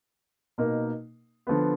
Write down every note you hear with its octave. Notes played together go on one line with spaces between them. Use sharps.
B2 A#3 D#4 A#4
D3 F3 B3